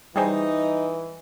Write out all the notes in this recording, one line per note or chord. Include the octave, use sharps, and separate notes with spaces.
E3 G3 D#4 G#4 C5 G5 G#5